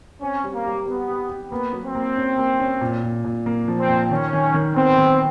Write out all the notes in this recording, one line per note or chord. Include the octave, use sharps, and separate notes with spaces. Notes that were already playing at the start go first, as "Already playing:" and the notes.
C4 C#4
G3
A#3
G3
G3 B3
G4
G4
A#3 B3
F#3
C4
A#3
C#4
A#3
C#4
A#2
A#2
A#2
A#3
F3
C4
A#2
D#3 C#4
D#3
D#3
B3 C4
D#3